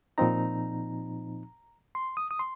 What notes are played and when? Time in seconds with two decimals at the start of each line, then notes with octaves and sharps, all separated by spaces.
0.18 A#2 F3 C4 D#4 A#5
1.95 C6
2.17 D#6
2.31 D#6
2.39 C6